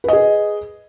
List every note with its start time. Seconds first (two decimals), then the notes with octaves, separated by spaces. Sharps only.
0.04 B4
0.08 D#5
0.13 G#4